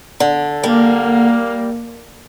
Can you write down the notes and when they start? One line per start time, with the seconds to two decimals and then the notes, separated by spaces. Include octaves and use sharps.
0.20 D3
0.63 G3 A#3